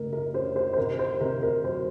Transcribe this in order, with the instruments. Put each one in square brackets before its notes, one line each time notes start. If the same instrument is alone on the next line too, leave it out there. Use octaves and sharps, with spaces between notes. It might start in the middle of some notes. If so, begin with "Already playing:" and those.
Already playing: [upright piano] C#3 A3 A#4
A#4
C#4 C5
C5
C5
C3 A#4
C5
C3 A#4
A#4
F#3 C5